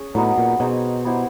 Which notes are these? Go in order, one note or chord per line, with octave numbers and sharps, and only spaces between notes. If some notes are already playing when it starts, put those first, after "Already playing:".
Already playing: C#4 G#4
A2 F#3 B3 D#4
A#2
B2 C4 D#4 G#4 C#5
B3 E4 G4 C5